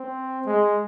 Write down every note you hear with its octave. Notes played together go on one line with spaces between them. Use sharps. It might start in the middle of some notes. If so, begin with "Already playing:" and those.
Already playing: C4
G#3